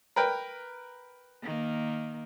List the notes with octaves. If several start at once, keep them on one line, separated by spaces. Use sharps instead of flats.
A#4 B4 G5
D#3 A#3